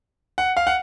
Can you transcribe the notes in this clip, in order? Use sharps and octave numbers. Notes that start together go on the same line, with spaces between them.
F#5
F5
F#5